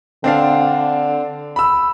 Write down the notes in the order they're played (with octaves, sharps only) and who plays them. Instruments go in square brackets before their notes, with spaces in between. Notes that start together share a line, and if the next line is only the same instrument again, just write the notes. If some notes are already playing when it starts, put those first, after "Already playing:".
[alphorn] D3 [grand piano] C4 D4 F5
[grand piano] B5 E6